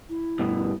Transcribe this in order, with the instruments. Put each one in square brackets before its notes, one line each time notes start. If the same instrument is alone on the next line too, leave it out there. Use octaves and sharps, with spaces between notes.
[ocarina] E4
[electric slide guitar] G2 B2